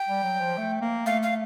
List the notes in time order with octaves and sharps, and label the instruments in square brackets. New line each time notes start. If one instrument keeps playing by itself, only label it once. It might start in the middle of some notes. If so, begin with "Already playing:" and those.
Already playing: [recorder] G5
[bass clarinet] G3
F#3
F3
A3
A#3
[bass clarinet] A3 [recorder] F5
[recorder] F5